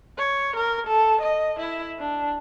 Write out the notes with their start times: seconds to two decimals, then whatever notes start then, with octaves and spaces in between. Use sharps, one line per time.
0.18 C#5
0.57 A#4
0.87 A4
1.22 D#5
1.60 E4
1.99 D4